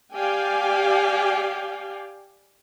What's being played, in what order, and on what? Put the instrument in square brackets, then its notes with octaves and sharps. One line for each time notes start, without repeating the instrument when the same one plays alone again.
[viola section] G4 D5 F5 G5 G#5